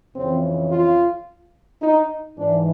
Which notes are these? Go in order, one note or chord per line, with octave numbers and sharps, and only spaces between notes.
F2 C#3 E3 C4
F4
D#4
G#2 E3 D4